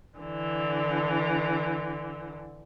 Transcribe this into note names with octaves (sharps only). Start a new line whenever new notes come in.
D3 E3